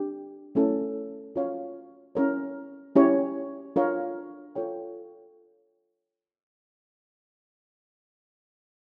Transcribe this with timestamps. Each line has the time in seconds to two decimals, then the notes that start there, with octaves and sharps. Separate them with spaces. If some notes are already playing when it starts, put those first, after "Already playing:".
Already playing: D4 G4
0.55 A3 C#4 E4 A4
1.35 C#4 F4 C#5 F5
2.15 C#4 E4 A#4 C#5
2.96 C#4 E4 G4 C#5
3.76 D4 F4 A#4 C#5 F5
4.55 F4 A4 C#5 G5